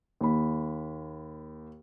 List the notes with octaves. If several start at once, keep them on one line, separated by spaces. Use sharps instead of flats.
D#2 B5